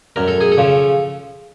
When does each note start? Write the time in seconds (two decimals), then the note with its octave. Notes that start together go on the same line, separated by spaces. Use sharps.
0.16 F#2 A#4
0.28 A4
0.41 G#4
0.52 A4
0.58 C#3 F3